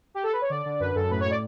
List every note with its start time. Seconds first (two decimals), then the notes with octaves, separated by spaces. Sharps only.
0.14 G4
0.23 A4
0.32 B4
0.41 C#5
0.50 D3 D5
0.66 D3
0.80 F#2 B4
0.95 F#2 A4
1.11 A2 B4
1.20 C#5
1.25 A2
1.30 D5